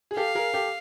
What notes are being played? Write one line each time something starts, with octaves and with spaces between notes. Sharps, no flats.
G#4
G4 A4 F5
G#4 A#4
G4 A4